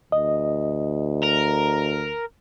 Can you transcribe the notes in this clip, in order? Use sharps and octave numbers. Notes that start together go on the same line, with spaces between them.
D2 D#5
A#4